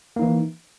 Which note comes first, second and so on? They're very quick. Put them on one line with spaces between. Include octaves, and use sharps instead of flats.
A#3 D#4 E3